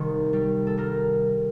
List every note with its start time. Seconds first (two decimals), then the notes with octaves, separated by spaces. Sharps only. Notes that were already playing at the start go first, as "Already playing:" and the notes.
Already playing: C2 C3 D#3
0.33 G3
0.67 A4
0.78 G3 A#4